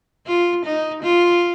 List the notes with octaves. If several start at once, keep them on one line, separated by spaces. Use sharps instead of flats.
F4
D#4
F4